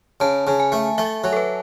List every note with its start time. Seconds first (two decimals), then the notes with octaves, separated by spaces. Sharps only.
0.20 C#3 A5
0.47 C#3
0.60 G#5
0.72 A3
0.98 A3 E5
1.24 F#3
1.33 A4
1.37 B4